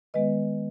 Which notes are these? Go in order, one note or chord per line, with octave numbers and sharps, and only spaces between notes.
D#3 G#3 B3 B4 D#5